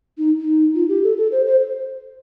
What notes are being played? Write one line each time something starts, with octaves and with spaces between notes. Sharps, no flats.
D#4
D#4
F4
G4
A4
A4
C5
C5